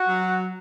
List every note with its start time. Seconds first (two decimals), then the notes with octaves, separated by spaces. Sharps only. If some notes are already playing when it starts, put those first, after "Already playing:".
Already playing: F#4
0.08 F#3